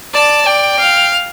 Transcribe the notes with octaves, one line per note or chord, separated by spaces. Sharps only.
D5 A5
D5 G5
F5